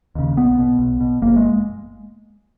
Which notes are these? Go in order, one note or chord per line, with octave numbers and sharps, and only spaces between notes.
D#2 C#3
B1 B3
B2
B1
B2
F#1 A#3
G#3